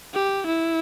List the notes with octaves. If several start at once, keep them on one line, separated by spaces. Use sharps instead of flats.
G4
E4